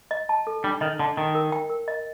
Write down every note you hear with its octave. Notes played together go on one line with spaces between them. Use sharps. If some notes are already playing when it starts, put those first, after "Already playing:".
D#5
A5
A4
G3 D4
D#3 D#5
D3 A5
D#3 D#5
A#4
G5
A#4
D#5